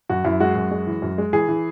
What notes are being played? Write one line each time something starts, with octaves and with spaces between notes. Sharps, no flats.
F#2 F#4
F#2 E4
G#3 F#4
F#2
G#3
E3
F#2
G#3
E3 G#4
E3